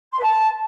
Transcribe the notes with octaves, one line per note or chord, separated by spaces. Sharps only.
C6
B4
A5